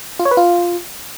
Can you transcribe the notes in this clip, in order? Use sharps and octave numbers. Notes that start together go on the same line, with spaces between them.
F4
C#5
B4
F4